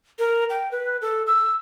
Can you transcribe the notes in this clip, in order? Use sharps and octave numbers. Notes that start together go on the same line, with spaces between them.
A#4
G5
B4
A4
E6